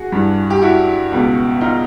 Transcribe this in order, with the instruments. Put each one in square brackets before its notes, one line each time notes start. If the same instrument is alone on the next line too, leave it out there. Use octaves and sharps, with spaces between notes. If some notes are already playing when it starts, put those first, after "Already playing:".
Already playing: [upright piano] F#4 G#4
G2 E3
G4
E4 F#4
C#2 B2
D#4 F4